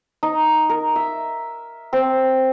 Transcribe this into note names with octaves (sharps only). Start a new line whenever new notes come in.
D#4
A#4
E5
C4